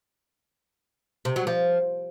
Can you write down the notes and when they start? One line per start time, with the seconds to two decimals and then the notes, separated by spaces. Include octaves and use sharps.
1.25 C3
1.36 F#3
1.47 F3